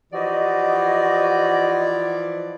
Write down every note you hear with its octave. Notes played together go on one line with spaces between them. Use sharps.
E3 F3 F#4 G4 D5 D#5